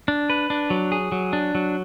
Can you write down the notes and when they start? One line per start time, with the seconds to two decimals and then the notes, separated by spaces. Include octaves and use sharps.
0.08 D4
0.30 B4
0.50 D4
0.70 F#3
0.92 G#4
1.12 F#3
1.33 D4
1.55 F#3